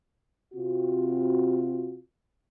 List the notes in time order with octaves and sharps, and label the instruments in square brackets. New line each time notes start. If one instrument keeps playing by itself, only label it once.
[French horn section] C3 C4 F4 F#4